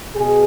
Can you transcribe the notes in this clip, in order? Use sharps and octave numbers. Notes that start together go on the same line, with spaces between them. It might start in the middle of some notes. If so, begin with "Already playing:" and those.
B2 G#4